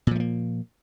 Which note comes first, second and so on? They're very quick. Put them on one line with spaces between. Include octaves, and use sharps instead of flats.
A#2 F3 A3 A#3